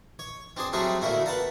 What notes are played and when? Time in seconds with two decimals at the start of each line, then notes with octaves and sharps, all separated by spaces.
0.19 C#5
0.57 C4 D4 G#4 C5
0.73 F#3 G3 A3 C4 F#4 G#4
1.01 D2 A3 A#3 E4 F#4
1.26 B4 F#5 A5 A#5